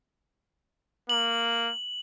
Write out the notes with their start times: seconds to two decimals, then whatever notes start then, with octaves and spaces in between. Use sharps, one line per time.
1.09 A#3 F#7